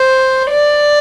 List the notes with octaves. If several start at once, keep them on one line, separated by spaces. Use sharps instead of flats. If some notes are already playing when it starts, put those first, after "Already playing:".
Already playing: C5
D5